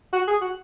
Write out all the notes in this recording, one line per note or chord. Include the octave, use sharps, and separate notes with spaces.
F#4
G#4
F#4